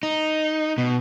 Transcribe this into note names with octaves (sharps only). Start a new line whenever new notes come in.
D#4
B2